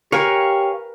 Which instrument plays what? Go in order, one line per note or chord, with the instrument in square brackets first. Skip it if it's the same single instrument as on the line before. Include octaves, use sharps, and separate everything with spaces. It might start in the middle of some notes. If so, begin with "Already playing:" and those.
[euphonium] G4 [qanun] A#4 B4 [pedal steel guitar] C#5 F5 G#5